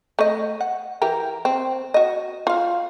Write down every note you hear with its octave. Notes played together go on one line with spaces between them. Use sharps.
A3 D#5
F#5
E3 G4 A#4
C4
F#4 D#5
F4 F5